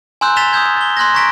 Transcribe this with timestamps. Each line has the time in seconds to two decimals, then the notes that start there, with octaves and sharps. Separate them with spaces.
0.21 G#5 A#5 C6 E6 F#6 G6
0.36 A6 B6 E7 F7 G7
0.53 D#6 E6 G6 G#6
0.76 A6 G7
0.97 C6 F#6 G#6 A#6
1.14 A#5 C#6 G#6 A#6 B6 D7